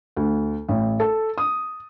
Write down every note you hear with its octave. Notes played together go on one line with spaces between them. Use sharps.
D2
A1
A4
D#6